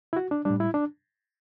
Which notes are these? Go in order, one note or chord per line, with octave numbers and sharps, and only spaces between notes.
E4
F#4
D4
A2 G3 D4
E4
D4